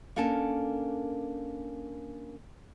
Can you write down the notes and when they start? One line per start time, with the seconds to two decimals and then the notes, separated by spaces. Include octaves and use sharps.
0.16 A#3 C#4 D4 A4 A#4 A5